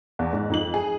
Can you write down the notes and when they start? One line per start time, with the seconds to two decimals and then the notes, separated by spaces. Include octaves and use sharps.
0.19 E2
0.33 G#2
0.50 F2 D#4 F#7
0.74 G#4